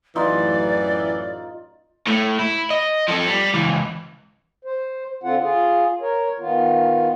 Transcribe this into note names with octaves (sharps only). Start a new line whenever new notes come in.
A1 F#2 E3 D#4 F4 D5
A2 A3
E4
D#5
F3 A4
G3
C#2 E3
C5
D3 C4 F4 F#5
F4 G#4
A#4 C#5
D#3 B3 F4